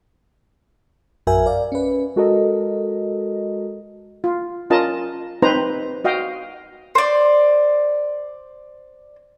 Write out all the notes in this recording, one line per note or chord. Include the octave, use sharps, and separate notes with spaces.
A#1 F#2 F#4 A#4 E5 G#5
A#4 D5 F5
C#4 B4
G#3 F#4 A4 A#4 D#5
F4
C#4 F4 A#4 D#5 A5
C4 D#4 B4 C5 A#5
F#4 D#5 F5 G5
C5 D5